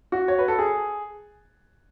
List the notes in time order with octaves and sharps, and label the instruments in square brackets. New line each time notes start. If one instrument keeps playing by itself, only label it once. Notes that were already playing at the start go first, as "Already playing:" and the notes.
[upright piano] F#4
C#5
B4
A4
G#4